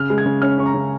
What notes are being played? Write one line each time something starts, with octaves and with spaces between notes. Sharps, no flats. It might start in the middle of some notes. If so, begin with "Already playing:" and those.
Already playing: C#3 F6
G#3
G#6
C#3
C#4 F6
C#4 C#6
A#5
C#3